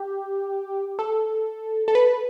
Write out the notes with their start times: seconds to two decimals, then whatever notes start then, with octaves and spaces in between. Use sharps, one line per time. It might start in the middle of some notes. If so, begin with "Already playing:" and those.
Already playing: G4
0.99 A4
1.88 A4
1.95 B4